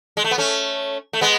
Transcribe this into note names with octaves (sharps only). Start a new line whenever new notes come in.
G#3
A3
B3
A3 C#4
A3
G#3 B3